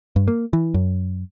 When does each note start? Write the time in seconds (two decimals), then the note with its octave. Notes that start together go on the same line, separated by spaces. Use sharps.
0.16 G2
0.28 A#3
0.53 E3
0.74 F#2